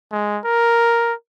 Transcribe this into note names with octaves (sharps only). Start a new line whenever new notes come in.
G#3
A#4